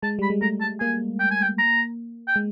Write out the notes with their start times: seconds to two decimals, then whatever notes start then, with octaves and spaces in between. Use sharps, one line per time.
0.03 G#3 A5
0.19 G3 B5
0.30 G#3
0.42 A3 A#5
0.61 A5
0.80 A#3 G#5
1.20 G5
1.31 G#5
1.42 G5
1.58 A#5
2.28 G5
2.36 G#3